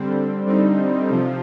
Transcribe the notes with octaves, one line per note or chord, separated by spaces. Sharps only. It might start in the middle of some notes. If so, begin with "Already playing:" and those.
Already playing: D3 G3 C4
D3 G3 C4 D#4
C3 F3